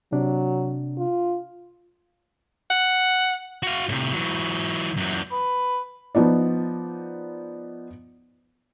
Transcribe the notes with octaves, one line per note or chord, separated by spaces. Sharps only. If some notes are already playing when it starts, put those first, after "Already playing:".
C3 F#3 D4
F4
F#5
F#4 F5
A2 C3
E3 F#3
F#2 E3
B4
F3 B3 D#4 D5